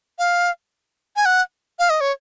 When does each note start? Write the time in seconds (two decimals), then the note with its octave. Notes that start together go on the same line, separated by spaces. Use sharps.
0.19 F5
1.16 G#5
1.25 F#5
1.79 F5
1.90 D#5
2.01 C#5